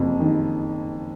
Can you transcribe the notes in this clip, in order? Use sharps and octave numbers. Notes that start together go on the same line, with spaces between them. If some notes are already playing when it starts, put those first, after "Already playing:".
Already playing: F#1 F2
D#3